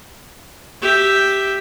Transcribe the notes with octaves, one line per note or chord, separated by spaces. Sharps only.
G4 E5